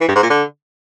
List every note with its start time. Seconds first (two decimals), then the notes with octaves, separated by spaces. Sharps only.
0.01 E3
0.08 G2
0.16 G#2
0.23 A#2
0.30 D3